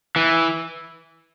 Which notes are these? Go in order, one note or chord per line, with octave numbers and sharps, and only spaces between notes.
E3